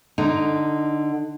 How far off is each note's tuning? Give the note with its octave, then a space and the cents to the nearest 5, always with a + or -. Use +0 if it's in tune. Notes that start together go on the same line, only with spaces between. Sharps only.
D3 +15 D#4 +0